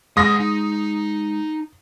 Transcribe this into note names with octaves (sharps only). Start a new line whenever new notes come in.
G#3 D#5 F#5 D#6 A#6
D#4